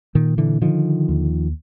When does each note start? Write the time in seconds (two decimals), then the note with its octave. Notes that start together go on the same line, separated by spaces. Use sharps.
0.15 A#2 D#3
0.38 D3 E3
0.62 D3 D#3 F3
1.09 D#2